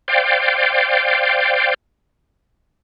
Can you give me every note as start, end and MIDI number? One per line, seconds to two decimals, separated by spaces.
0.08 1.74 72
0.08 1.74 74
0.08 1.74 77
0.08 1.74 79